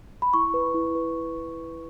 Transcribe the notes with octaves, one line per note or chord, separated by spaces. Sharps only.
B5
E4 C#6
B4
E4
B4